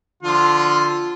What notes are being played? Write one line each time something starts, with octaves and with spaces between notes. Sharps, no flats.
D3 F3 F4